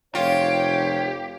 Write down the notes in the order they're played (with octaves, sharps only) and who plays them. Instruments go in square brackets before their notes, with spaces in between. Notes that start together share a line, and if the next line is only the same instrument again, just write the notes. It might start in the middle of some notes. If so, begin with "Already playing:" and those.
[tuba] F1 [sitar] F4 [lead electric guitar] G4 [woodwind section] C#5